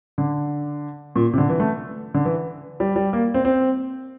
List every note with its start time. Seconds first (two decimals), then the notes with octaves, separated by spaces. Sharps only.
0.18 D3
1.16 A#2
1.33 C3
1.38 D3
1.49 E3
1.60 A3
2.14 D3
2.25 E3
2.80 G3
2.96 G3
3.13 A#3
3.34 C4
3.45 C4